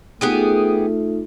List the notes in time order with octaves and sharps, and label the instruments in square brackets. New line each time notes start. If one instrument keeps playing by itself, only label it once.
[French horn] A3 [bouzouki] B3 G4 G#4 [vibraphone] D#4 F4